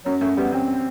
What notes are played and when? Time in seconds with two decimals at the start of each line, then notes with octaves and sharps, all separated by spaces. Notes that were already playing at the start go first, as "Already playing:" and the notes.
0.05 F#2 F#3
0.21 F#2 A3
0.37 G3 B3
0.52 F#2 C4